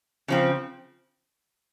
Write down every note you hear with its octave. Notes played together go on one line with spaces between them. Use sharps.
C#3 F3 C4